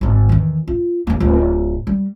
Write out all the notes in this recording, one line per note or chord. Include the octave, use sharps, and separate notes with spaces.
G#1 D3
E2 D#3
F4
D#2 A#3
D1 F4
G3